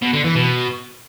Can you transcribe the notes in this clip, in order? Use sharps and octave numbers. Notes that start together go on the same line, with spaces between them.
B2
D3
E3
B2